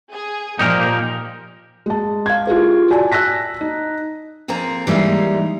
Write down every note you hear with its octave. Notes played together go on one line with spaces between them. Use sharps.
G#4
A#2 F3 A#3 D#4 G4 A#4
G#3 A5
F5 G#6
E4 F4 G4 G#4 A#4 B4
F#4 D5 G#5 A5
A5 E6 F#6 A#6 B6
D#4
F2 A#3 C4 G#4 A#5
E3 G3 G#3 A#3 D#4